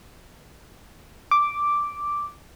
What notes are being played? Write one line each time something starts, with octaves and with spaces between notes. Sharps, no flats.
D6